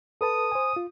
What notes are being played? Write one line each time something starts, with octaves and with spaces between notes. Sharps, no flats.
A4 B4 A5 D#6
C5 G#5
F4